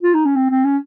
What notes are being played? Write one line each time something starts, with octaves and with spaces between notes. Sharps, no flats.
F4
D#4
C#4
C4
C4
C#4